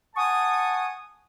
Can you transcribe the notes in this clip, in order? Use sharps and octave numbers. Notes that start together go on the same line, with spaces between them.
F#5 G#5 A5 C#6 D#6